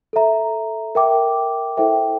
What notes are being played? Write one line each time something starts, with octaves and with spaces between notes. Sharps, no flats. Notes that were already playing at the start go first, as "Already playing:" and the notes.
A4 E5 A#5
A#4 E5 G5 D6
E4 A4 C5 E5 G5